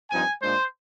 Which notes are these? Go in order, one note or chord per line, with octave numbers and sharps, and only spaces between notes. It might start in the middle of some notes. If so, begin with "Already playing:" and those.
G2 F3 C4 D#4 G#5
A#2 G#3 D4 C5